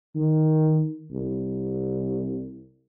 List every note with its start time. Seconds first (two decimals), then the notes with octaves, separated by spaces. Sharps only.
0.15 D#3
1.12 C2